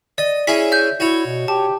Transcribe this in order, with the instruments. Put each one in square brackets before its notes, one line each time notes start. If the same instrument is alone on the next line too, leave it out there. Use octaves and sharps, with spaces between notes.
[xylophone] D5 [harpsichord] D#5
[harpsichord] C#4 E4 G#4 [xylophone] B6
[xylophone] E5 G6
[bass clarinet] E4 [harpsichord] F#4 C#5
[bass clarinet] B2
[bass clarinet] G4 [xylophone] A5